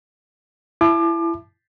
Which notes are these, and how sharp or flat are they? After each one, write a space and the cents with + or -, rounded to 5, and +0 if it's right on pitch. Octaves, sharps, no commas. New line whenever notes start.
E4 +20 A5 -30 D6 +30